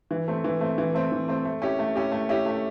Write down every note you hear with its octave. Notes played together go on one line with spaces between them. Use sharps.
E3
A3 C4
E3
A3 C4
E3
A3 C4
E3
A3 C4
A3
C#4 E4 G4
A3
C#4 E4 G4
A3
C#4 E4 G4
A3